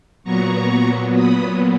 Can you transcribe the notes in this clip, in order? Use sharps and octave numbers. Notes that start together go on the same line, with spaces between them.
A#2 F#3 B3 A#5 C#6
B5 D#6